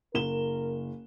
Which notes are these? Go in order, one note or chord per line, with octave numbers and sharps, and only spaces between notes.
F#1 A#4 E7 G7